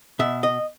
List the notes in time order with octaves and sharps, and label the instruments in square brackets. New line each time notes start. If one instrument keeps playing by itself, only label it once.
[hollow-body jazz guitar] B2 E5
D#5